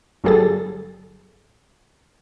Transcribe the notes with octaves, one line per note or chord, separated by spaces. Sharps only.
G1 F#3 G3 G#4 A4 A6